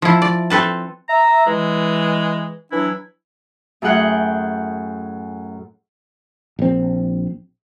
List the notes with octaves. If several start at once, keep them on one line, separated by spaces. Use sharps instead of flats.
F3 E4
D5
C4 A4 B4 A5
E5 A#5
E3 G#3
E3 F#3 D4 E4
F#2 A2 G#4 F#5 G5 F#6
A#1 C4